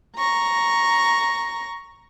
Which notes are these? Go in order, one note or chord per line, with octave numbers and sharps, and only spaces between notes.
A#5 C#6 A#6